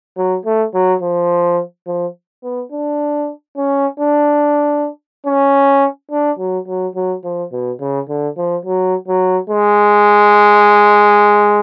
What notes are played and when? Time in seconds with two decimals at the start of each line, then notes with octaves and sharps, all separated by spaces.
0.17 F#3
0.45 A3
0.74 F#3
1.02 F3
1.87 F3
2.43 B3
2.72 D4
3.57 C#4
4.00 D4
5.26 C#4
6.11 D4
6.39 F#3
6.67 F#3
6.95 F#3
7.24 F3
7.52 B2
7.80 C#3
8.09 D3
8.37 F3
8.65 F#3
9.08 F#3
9.50 G#3